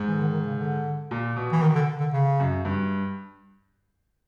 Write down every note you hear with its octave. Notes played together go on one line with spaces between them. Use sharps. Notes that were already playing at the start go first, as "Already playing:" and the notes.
Already playing: G#2
E3
D3
D#3
D#3
C#3
D3
A#2
B2
E3
D#3
D3
D3
C#3
F#2
G2